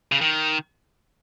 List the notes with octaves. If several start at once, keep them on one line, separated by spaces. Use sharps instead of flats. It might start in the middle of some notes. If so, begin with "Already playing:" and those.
C#3
D#3